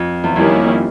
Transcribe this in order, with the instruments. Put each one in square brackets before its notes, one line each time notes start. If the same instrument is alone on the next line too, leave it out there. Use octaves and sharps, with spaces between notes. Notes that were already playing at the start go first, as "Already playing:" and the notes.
Already playing: [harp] F2
E2
[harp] F2 [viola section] D#3 G3 A#3 C#4 E4